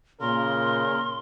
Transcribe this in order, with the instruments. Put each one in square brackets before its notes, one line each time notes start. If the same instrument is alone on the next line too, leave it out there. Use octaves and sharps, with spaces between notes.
[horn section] A#2 [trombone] C#3 [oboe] A#4 [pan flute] C6